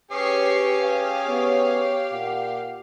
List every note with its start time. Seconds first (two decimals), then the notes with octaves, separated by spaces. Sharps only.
0.11 C#4 G4 G#4 B4 C#5 C#6 D6 C7
0.84 G4 F5 G5
1.27 B3 C#5
2.13 A#2 F#5